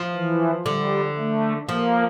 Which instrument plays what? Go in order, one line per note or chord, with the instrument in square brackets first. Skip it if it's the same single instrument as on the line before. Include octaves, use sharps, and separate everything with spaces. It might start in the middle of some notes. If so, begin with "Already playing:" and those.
Already playing: [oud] F3
[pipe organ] E3
[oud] D3 [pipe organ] G3
[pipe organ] A3
[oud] F3 [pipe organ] A#3